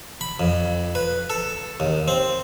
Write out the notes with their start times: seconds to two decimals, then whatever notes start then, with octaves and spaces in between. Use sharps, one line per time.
0.21 B5
0.40 F2
0.95 B4
1.30 A4
1.80 D#2
2.08 C4